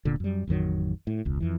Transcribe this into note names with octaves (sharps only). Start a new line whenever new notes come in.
D1 A#2 D3
F#2 G3
A1 F2 D#3 F#3
A2
E1 C#2
F2 E3